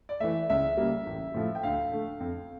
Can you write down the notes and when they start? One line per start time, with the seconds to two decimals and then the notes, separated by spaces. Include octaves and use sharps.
0.09 D5
0.20 E3 A3 E5
0.50 C#2 E5
0.77 C#3 G3 A#3
1.06 A1
1.34 A2 F3 A3
1.55 G5
1.63 D2 F5
1.91 D3 A3
2.20 F2